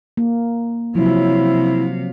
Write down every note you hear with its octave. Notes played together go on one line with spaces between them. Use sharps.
A#3
C3 F3 F#3 E4 F5